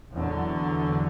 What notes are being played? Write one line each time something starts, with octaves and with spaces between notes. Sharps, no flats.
E2 D3 F#3